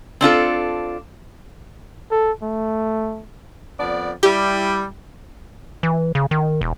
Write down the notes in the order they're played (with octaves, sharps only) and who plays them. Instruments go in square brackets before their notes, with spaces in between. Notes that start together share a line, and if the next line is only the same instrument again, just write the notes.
[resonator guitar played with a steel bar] C4 D4 F4 A4
[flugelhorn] A4
A3
[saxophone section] F2 B3 D5
[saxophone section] G3 E4 [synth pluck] G4
[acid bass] E3
C#3
D#3
E1